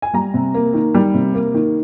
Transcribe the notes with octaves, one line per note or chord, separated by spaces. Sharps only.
G#5
G3 A#5
C3
A#3
D#3
G3
C3
A#3
D#3